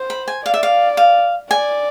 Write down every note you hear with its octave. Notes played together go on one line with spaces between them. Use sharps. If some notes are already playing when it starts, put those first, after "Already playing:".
Already playing: C5
B5
G#5
D5 F5
E5
F5
F5
D5 G#5